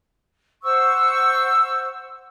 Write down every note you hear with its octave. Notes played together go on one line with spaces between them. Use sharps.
C5 F#5 C#6 E6